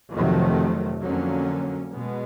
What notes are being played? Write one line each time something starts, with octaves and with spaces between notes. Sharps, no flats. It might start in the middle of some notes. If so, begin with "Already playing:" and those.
F2 C3 D#3 F#3 A3
F2 D3 F#3 A#3 C#4
B2 G#3 B3